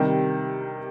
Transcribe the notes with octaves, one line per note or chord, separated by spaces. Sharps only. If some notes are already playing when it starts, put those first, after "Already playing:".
Already playing: C3 D#3 G3